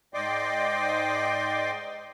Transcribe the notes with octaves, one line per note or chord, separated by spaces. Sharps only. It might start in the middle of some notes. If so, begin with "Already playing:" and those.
G#2 D5 D#5 G5 C6 D6